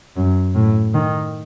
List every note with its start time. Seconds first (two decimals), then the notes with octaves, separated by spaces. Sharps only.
0.16 F#2
0.55 A2
0.94 D#3